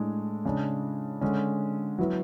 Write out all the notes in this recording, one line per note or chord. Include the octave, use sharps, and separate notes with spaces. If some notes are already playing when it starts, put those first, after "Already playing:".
Already playing: A2 G#3 D4
C#3 G#3 D4
D3 G#3 C#4
F#3 B3 E4